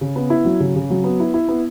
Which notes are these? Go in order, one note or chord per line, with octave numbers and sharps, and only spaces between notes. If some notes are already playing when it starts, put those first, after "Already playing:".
C#3
B3
E4
F#3
C#3
C#3
F#3
B3
E4
E4
B3